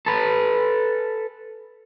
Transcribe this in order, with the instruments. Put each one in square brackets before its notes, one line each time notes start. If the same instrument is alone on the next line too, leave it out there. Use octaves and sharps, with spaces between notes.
[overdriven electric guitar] A4 B4